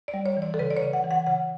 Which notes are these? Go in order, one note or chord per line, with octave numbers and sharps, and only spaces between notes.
D5
G3
C#5
E3
D5
A4
C#3 B4
D5
C#5
C#3
F#5
E3
F#5
C#3 F#5